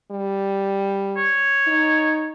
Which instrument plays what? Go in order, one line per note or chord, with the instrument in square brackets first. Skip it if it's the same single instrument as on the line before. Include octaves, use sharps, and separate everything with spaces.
[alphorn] G3
[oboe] C#5
[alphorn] D#4